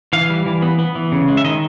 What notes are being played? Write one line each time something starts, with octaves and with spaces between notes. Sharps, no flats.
E3 F5
G3
E3
B3
B3
E3
C#3
G#3
E5
D#3 D#5